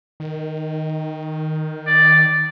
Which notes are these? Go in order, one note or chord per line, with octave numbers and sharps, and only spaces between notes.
D#3
D5